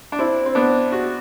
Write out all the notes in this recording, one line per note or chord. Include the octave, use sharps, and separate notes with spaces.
D4
C4 E4
C4
B3 D4
F#4